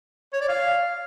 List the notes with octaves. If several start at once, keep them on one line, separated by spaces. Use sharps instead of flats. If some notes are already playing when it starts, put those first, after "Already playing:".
C#5
D5
F5